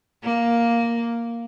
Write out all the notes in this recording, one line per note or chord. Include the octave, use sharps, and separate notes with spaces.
A#3